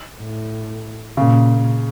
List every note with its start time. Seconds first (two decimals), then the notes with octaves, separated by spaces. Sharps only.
0.20 A2
1.17 A#2 C#3